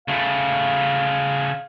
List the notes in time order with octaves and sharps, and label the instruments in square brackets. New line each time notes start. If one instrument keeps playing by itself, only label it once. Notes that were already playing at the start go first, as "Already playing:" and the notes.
[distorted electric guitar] C#3 A3 [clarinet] F5